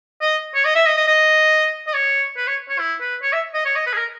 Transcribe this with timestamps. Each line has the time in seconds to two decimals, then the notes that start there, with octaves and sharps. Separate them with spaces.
0.21 D#5
0.54 C#5
0.65 D#5
0.75 E5
0.86 D#5
0.97 D#5
1.07 D#5
1.87 D#5
1.94 C#5
2.37 B4
2.47 C#5
2.69 C#5
2.79 E4
3.01 B4
3.22 C#5
3.33 E5
3.54 D#5
3.65 C#5
3.76 D#5
3.87 B4
3.93 G#4
3.97 A#4